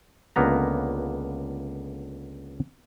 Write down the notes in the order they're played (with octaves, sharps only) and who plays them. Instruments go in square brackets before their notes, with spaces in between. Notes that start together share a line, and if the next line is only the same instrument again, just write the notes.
[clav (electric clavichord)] C#2 D3 A#3 B3 A#5